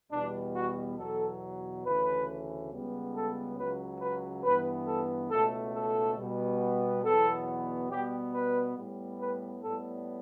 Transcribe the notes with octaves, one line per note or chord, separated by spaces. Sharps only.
E2 B2 G3 B3 D4
F#4
E2 B2 F#3 A4
D2 C#3 E3 A3 B4
C#2 C#3 G3 B3
A4
C#2 C#3 F#3 B4
B4
G2 E3 B3 B4
A4
C#2 B2 A3 A4
A4
B2 G3 B3
E2 B2 F#3 B3 A4
B2 G3 B3 G4
B4
A2 G3 B3
B4
A2 G3 B3 A4